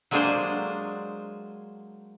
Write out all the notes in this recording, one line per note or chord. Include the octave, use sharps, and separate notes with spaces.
F#3 G#3 A#3 D4 G#4 C5